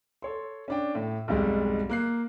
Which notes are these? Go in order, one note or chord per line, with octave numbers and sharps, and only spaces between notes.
A4 C#5 C6
C#4 D4 G5
A2
B1 F2 G#2 G3 G#3
A#3 F#6 C7